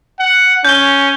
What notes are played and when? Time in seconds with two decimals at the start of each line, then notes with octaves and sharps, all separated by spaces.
0.20 F#5
0.65 C#4 G6 G7